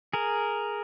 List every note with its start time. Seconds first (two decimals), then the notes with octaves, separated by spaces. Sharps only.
0.13 G#4 A#4